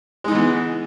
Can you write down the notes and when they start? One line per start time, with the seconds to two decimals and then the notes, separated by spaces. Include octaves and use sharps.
0.24 G#3
0.28 D#4
0.31 E3
0.35 B3